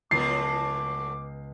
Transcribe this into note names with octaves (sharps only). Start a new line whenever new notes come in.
C#2 A2 F3 F#3 B3 D6 A6 C7